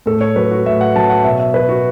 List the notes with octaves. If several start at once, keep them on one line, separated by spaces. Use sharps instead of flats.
A2 A4
C#5
F#3 B4
F#4
A2 E5
F#5
F#3 A5
F#5
B2 E5
E5
F#3 B4
F#4